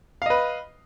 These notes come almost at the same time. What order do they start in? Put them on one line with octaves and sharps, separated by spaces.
F5 D#5 B4